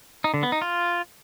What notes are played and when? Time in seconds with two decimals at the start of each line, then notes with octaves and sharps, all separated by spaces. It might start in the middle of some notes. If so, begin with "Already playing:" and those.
0.24 D#4
0.34 D3
0.43 B3
0.52 D#4
0.62 F4